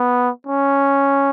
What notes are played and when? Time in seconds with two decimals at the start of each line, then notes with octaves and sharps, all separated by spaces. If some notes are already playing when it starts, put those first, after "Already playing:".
Already playing: B3
0.47 C#4